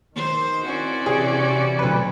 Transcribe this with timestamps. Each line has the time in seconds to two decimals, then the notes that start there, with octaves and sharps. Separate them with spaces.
0.16 D#3 C5
0.65 C4 C#4 E4 F#4 D5
1.06 C3 E3 G#4
1.79 D2 B2 F#3 B4